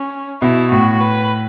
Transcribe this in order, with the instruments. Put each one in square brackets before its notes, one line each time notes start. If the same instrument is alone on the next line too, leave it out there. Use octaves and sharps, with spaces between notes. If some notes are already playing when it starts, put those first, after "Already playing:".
Already playing: [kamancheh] C#4
[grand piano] B2 [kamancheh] E4
[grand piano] A2 [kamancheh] F#4
[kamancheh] B4